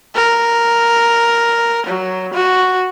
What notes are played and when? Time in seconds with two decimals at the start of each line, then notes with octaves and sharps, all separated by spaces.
0.15 A#4
1.87 F#3
2.34 F#4